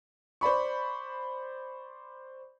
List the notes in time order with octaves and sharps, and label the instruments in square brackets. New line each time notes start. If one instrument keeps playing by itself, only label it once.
[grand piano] C5 D5 B5 C#6